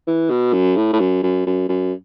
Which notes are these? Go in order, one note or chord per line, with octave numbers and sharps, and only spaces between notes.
E3
B2
F#2
A2
A2
F#2
F#2
F#2
F#2